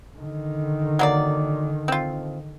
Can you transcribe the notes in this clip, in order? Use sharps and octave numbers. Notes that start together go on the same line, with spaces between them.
D3 D#3
F#3 A#3 D5
C4 F4